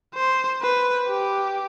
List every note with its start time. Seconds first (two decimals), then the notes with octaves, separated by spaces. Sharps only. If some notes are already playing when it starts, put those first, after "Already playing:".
0.15 C5
0.61 B4
1.08 G4